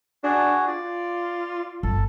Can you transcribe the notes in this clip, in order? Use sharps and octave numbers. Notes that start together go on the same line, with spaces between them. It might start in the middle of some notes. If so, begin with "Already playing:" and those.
D4 F#4 G#4
F4 D5
G1 A4